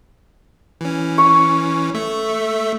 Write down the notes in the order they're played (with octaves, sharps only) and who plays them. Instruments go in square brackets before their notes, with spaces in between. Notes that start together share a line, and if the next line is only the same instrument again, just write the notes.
[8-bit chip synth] E3 C#4
[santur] C#6
[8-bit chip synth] A3 E5